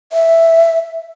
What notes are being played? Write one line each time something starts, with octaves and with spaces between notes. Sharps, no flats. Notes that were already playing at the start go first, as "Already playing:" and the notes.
E5